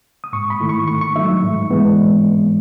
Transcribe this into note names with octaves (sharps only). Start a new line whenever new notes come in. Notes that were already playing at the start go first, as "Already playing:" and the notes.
D#6
G#2 C#6
B5
D#3 A3 E4
C#6
D#3 C#6
C#6
F#3 A3 D#4 E5
G#2
E3 G#3 B3